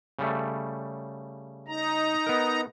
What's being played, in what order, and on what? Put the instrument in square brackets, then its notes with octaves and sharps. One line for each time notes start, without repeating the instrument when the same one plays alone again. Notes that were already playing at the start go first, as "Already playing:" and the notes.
[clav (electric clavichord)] C#3 G3 A3
[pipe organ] D#4 A#5
[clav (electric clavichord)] B3 A#4